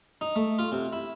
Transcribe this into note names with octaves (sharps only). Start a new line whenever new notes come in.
D#4
A3
F4
C3
E4